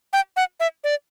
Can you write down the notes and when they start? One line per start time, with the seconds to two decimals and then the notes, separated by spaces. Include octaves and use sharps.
0.13 G5
0.37 F#5
0.60 E5
0.84 D5